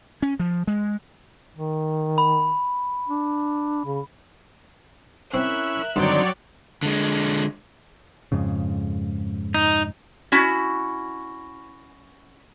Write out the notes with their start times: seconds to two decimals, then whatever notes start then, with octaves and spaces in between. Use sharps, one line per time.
0.22 C#4
0.39 F3
0.67 G#3
1.57 D#3
2.18 B5
3.08 D4
3.85 C#3
5.34 C4 C#4 E4 A#4 E5 F#6
5.96 G2 D3 D#3 F#3 C4 C#5 D5 G5
6.83 D3 G#3
8.32 F2 G#2 C#3
9.54 D#4
10.32 C#4 E4 F#4